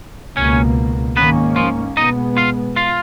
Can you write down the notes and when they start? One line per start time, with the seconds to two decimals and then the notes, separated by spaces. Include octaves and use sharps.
0.36 C#2 B2 A#3 C#4 C#5
1.16 G#2 D#3 A#3 B3 C#4 B4
1.56 F3 F4
1.97 B2 G#3 B3 D#4 D#5
2.37 F4 F5
2.76 F4 F5